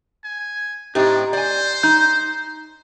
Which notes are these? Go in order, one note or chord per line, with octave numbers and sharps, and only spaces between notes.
G#5
A2 C4 D4 D#4 G4
C5 D5 G#5
D#4 G6